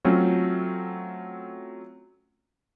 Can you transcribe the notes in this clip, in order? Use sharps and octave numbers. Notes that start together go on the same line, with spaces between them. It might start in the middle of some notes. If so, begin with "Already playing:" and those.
F#3 A3 C4 C#4 F4